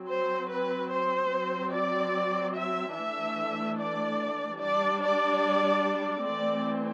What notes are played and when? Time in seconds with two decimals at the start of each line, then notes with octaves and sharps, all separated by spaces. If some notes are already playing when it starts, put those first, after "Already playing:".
Already playing: F#3 C4
0.09 C5
0.51 B4
0.91 C5
1.33 F#3 C4
1.73 D5
2.56 E5
2.96 E3 A3 D4 E5
3.78 D5
4.61 G3 D4 D5
5.02 D5
6.25 E3 A3 C4 D5